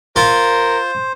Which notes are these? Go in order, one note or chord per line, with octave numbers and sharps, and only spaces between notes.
F4 A#4 C5